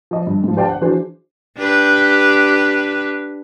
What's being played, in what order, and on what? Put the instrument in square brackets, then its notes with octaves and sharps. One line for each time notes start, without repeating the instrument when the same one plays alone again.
[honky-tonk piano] F3 D#5
G2
G#2 F3
G4 C5 D5 F5 G5 A5
F#5
E3 F3 D4 F#4 G#4 C5
[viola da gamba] D4 G4 B4